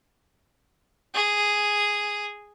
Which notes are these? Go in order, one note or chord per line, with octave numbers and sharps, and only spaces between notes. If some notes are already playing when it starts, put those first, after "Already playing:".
G#4